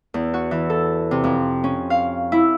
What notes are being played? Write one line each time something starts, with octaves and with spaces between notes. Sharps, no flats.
E2
F#4
E3
A4
C3
F2
C#4
F5
E4